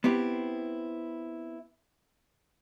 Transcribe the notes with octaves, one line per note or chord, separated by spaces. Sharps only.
B3 C4 E4 G4